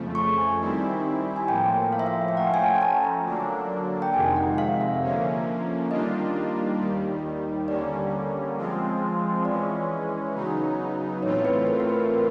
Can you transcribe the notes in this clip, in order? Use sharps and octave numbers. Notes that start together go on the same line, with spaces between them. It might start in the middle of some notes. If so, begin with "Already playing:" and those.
Already playing: F2 C#3 F3 A3
C#6
G#5
D#3 G3 C4 E4
G#5
A2 F3 A#3 G5
F5
E5
F5
G5
F3 A3 C#4 F#5
G#5
G5
G#5
A5
A#5
D3 F#3 A#3 D4
G5
F2 C3 D#3 G#3 G#5
F#5
F5
E5
D3 F3 A#3 C#4
D#3 G3 A#3 D4 F4 D#5
D#2 D#3 G3
D3 G3 A#3 C#4 D5
F3 G#3 C4 F4
E3 G#3 C#4 D5
C#3 F#3 B3 D#4
A2 E3 A3 C4 F4 C#5
B4
A#4
A#4
B4